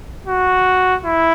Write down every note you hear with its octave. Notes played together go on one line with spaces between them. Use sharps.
F#4
E4